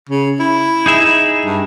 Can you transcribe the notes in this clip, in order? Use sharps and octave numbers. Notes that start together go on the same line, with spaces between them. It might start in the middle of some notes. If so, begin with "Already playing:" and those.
C#3
E4
D#4 G#4 E5
G2